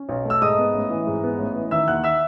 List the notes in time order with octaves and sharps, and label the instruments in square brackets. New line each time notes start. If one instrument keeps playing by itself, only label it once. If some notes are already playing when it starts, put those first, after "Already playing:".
Already playing: [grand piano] C#4
B1
A3
E6
G#2 D#5 D#6
B3
A1
E3
G#2
B3
A1
E3
D#3 E5 E6
D#2 F#5 F#6
E5 E6